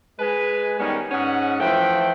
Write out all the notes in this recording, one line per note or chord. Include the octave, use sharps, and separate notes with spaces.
G#3 B4 G#5
D#3 G3 G#3 B3 C#4 D#4
G#2 C#4 F#5
E3 F3 A3 G5